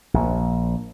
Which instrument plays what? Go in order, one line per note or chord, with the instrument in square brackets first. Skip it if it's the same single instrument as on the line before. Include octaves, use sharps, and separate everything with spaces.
[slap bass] A#1